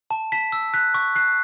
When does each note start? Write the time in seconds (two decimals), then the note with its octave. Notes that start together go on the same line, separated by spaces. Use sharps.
0.11 A5
0.32 A5 B6
0.52 E6
0.74 F#6 B6
0.94 C#6
1.15 F#6 C7